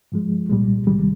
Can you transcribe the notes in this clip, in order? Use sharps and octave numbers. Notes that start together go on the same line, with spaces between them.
G#2 F3 G#3
C2 A#2 G3 G#3
C2 C3 D#3 G3 G#3